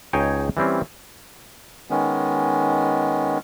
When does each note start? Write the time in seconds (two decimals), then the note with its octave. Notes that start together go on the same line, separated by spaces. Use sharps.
0.13 C#2 D#4 G#4 C#5 G5 G#5
0.57 E3 G3 C4 C#4
1.90 D#3 G#3 B3 C#4